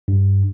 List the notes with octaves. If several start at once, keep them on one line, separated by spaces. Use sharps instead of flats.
G2